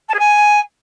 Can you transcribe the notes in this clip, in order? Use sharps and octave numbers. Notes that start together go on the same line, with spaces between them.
A5
G#4
G#5